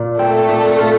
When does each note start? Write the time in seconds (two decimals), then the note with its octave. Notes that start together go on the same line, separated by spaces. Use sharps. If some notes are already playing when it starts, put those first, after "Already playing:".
Already playing: A#2 F4
0.18 A3 C4 A4
0.49 A#2
0.79 F4